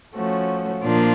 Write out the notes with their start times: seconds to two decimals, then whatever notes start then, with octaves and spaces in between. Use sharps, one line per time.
0.15 F3 A3 C#4 F#4
0.83 A#2 F3 A#3 D4 F4